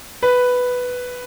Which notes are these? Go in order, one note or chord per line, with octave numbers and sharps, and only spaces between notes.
B4